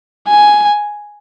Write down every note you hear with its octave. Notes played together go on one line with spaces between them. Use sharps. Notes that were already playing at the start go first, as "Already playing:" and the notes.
G#5